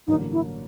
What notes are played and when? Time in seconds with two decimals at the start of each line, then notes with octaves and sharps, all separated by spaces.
0.07 A1 G2 D3 F#3 A#3 D#4
0.32 E4